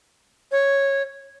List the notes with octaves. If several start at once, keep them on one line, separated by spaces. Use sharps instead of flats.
C#5